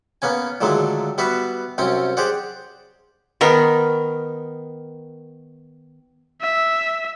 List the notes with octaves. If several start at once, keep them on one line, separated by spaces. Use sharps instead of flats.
A#3 B3 C#4 G#5
A#2 D3 D#3 F#3 G#3 A3
G3 B3 F#4 B4 E5
C2 F#2 C4 C#4 G5
G4 G#4 C5 D5 F#5
D#3 B3 A#4
E5